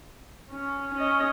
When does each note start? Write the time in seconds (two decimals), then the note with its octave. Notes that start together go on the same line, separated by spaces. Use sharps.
0.51 C#4
0.95 C#4 D#5